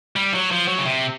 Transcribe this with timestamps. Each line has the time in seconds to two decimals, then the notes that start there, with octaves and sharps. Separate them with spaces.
0.16 G3
0.34 F#3
0.51 F3
0.68 F#3
0.78 C#3
0.85 C3